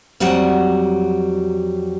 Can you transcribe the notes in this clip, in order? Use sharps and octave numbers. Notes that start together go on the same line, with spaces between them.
F2 F#3 G3 F#4 F#5